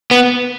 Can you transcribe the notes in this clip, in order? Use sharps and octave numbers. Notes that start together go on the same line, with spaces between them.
B3